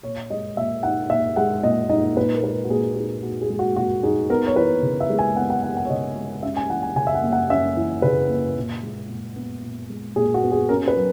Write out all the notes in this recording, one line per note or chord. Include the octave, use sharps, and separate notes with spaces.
A#2 C#5
G#3 D#5
A#2 E5
D#4 F#5
A#2 E5
G#3 F#5
A#2 D#5
D#4 D#5
A#2 B4
A#4
G#3 B4
F#4
A#2 G#4
D#4 G#4
A#2 F#4
G#4
G#3
F#4
A#2 F#4
D#4 G#4
B3 A#4
C#5
E3 B4
C#3
E5
G#3
G#5
B3 F#5
F#5
E3 F#5
F#5
C#5
C#3 D#5
G#3
C#4 E5
G#5
E3 F#5
G#5
C#3 G#5
E5
F#5
A#3
F#5
C#4 E5
E3
C#3 B4
A#3
A#2
G#3
A#2
B3
A#2
G#3
A#2 G#4
F#4
B3
G#4
C#4 A#4
B4
F#3